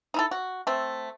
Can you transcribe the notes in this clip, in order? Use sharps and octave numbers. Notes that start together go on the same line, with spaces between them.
D#4 E4 A4
F#4
A3 C4